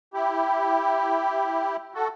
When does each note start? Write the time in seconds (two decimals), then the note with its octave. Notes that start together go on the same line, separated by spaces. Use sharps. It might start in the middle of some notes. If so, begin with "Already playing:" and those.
0.13 E4 G4
1.94 F#4 A4